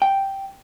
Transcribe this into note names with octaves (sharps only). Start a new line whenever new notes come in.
G5